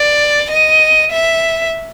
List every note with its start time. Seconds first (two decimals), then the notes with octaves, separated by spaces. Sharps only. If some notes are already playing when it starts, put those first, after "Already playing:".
Already playing: D5
0.51 D#5
1.12 E5